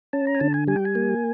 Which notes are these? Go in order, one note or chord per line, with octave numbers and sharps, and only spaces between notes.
C#4 A5
A#5
G#5
D3 A5
G#5
G3 G#5
G5
G#5
A#3